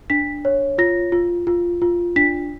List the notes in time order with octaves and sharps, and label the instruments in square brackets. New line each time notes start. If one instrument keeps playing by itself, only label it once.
[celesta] D4 B6
C#5
F4 A#6
F4
F4
F4
D4 B6